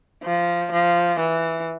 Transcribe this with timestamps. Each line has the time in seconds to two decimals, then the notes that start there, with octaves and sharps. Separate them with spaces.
0.23 F3
0.72 F3
1.19 E3